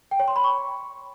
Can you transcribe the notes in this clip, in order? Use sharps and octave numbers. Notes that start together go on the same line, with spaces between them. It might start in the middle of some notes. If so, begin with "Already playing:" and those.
G5
C#5
C6
B5
C#6